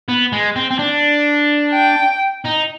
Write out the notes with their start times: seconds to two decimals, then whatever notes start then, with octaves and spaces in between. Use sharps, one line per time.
0.09 B3
0.33 G#3
0.56 C4
0.71 C4
0.79 D4
1.73 G5
2.45 D#4